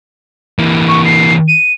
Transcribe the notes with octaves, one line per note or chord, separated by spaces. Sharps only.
E3 A#3
C#6
C7
D#7